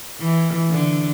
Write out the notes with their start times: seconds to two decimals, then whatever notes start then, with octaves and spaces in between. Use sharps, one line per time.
0.19 E3
0.69 D3